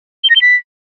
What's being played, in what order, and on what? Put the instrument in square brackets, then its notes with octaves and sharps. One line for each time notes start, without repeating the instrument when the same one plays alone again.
[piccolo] G7
A#6
G7
B6